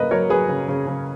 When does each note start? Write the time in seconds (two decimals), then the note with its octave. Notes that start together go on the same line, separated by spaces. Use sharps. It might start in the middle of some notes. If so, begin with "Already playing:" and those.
Already playing: C#3 A#3 A#4 B4 D#5
0.11 F#3 A#4 C#5
0.29 F#3 G#4 B4
0.49 C#3
0.68 C#3
0.87 C#3